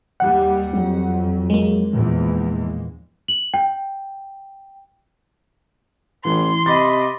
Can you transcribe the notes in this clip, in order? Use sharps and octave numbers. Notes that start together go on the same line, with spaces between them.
D#2 G3 F#5
F2 F#3
G#3 A#3
A#1 E2 A#2
F#7
G5
A1 E3 C6
C3 D#5 B5 D6 A6